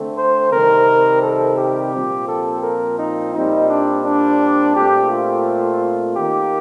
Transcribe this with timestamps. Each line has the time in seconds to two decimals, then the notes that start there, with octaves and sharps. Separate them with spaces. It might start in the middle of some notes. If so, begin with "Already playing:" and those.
Already playing: D3 A3 C4
0.17 C5
0.52 C3 D#3 G3 C4 A#4
1.23 A4
1.58 G4
1.94 A#2 F3 C4
2.28 A4
2.63 A#4
2.99 D#4
3.34 A#2 G3 C4 D#4
3.70 D4
4.05 D4
4.75 A#2 A3 C4 G4
5.11 F4
6.17 D#3 A#3 G4